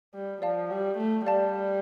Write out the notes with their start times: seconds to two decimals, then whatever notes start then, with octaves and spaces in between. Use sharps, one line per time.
0.14 G3
0.42 F3 D5 F5 A5
0.70 G3
0.98 A3
1.27 G3 D5 F5 A5